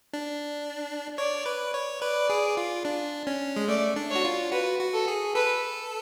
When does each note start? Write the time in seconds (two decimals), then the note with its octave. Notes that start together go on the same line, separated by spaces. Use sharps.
0.13 D4
1.18 C#5 D5
1.46 B4
1.74 C#5
2.01 B4 D5
2.30 G#4
2.57 F4
2.85 D4
3.27 C#4
3.56 G#3
3.68 A3 D5
3.96 D4
4.10 F#4 C#5
4.24 F4
4.52 F#4 B4
4.80 F#4
4.94 A4
5.08 G#4
5.35 A4 B4